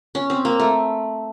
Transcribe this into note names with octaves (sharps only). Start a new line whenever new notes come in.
C#4
C4
A#3
A3